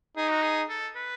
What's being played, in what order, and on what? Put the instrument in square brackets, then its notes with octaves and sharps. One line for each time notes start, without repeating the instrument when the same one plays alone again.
[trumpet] D#4 [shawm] G#4
[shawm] F#4
G#4
A4
B4